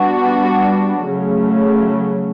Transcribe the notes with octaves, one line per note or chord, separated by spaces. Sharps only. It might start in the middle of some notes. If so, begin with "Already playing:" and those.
Already playing: G3 B3 D4 F#4
C#3 F#3 A3